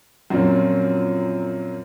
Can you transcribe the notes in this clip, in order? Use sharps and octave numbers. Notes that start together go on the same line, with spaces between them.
F#2 A#2 F3 A#3 C4 C#4